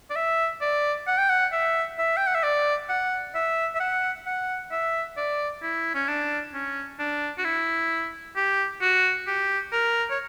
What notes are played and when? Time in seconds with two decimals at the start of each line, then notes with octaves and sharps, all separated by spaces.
0.10 D5
0.16 E5
0.61 D5
1.07 F#5
1.18 G5
1.29 F#5
1.52 E5
1.98 E5
2.17 G5
2.26 F#5
2.35 E5
2.43 D5
2.89 F#5
3.35 E5
3.75 E5
3.80 F#5
4.26 F#5
4.71 E5
5.17 D5
5.62 E4
5.94 C#4
6.08 D4
6.54 C#4
6.99 D4
7.38 F#4
7.44 E4
8.36 G4
8.81 F#4
9.27 G4
9.72 A#4
10.10 C#5